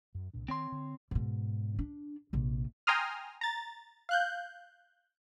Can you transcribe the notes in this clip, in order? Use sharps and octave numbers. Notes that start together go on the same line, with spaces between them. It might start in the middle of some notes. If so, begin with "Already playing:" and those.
F#2
C2 A#2 D4
D#3 C4 C#5 C6
D3
G#2 B2
D4
A#1 C3
G5 G#5 A#5 C6 D#6 F6
A#5 A6
F5 F#6 G6